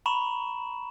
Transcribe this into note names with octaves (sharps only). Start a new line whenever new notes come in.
A#5 B5 C#6 E7